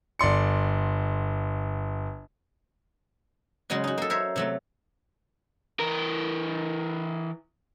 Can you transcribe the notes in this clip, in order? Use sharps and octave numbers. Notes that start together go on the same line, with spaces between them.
G1 D5 C6 C#7
C#3 F#3 G#3 C#4 F#4
D#4 F#4
A#3 A4
A#4 C5 C#5 E5
C3 F#3 A3
E3 A#4